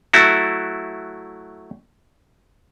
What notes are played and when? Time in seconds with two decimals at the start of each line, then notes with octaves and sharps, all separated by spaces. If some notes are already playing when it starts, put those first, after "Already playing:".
0.13 F#3 A3 E4 F#4